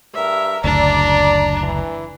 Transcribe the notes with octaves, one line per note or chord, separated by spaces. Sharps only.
G2 A#4 E5
F#1 D2 D4 D5 A#5
E3